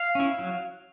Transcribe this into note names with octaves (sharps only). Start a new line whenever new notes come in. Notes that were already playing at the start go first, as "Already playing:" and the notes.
Already playing: F5
C#4 E4
F#3